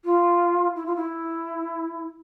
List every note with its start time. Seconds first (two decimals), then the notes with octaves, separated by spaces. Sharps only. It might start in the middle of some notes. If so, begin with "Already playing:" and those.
0.05 F4
0.76 E4
0.86 F4
0.96 E4